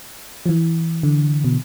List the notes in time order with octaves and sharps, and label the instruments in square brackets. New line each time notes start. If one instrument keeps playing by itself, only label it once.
[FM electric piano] F3
E3
D3
B2